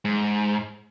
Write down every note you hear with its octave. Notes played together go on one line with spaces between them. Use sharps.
G#2